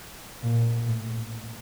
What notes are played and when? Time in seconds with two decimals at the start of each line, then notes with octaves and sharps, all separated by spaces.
0.43 A#2
0.87 A2